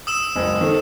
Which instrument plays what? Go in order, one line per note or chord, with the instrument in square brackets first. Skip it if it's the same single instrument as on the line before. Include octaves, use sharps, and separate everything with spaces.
[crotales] D#6 E6 E7
[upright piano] F#1 C#2
D#3 C4 A4